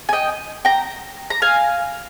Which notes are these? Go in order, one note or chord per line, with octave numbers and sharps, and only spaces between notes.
G#5
D#5 G5
G5 A#5
A#5
F5 G#5